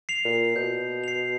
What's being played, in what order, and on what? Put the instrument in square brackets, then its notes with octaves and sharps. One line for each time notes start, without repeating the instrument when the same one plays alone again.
[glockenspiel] C7 F7
[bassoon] A#2
[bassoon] B2 [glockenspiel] G6
[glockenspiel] C7 F7